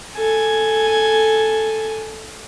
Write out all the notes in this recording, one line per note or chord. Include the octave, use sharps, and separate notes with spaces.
A4 G#5